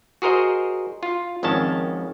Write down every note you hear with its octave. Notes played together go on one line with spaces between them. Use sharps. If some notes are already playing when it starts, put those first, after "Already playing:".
F#4 G#4 A#4 C5 D#5
F4
G#1 F2 D#3 C#4 A5